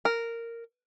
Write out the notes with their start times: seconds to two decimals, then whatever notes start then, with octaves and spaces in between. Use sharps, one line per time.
0.05 A#4